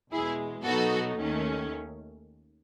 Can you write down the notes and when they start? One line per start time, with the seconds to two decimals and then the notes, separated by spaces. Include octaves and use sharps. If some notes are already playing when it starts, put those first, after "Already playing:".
0.12 E2 B2 G#3 E4 G#4
0.65 B2 F#3 B3 D#4 F#4 A4
1.17 D#2 D#3 A3 C#4